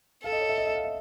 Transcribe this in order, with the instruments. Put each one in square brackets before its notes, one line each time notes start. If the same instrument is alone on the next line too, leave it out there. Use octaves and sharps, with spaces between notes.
[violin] A4 [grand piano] F5
[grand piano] D#5
C#5
E5
D#5
E5
F5
E5